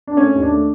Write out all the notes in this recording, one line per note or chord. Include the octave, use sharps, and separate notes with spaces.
D4
A3 C#4
D#2
D4
A3